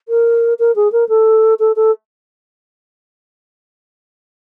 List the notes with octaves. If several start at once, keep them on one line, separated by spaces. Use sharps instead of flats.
A#4
A#4
G#4
A#4
A4
A4
A4